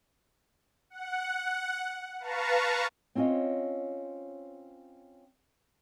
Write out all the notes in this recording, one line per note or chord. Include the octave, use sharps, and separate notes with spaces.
F#5
B4 F5 A5 A#5 C#6
C4 C#4 F4 C#5 D#5